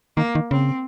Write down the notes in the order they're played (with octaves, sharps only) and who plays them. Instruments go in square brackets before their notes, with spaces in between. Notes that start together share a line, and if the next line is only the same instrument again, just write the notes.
[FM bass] D#3 [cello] A#3
[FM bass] D#3
[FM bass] C#3 [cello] C4